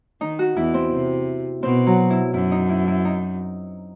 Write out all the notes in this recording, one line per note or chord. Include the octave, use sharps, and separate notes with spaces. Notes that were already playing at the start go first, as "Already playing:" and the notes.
D#3 D#4
F#4
E2 E3 E4
C4
C3
B2 C4
F#3
E4
F#2 E4
D#4
E4
E4
D#4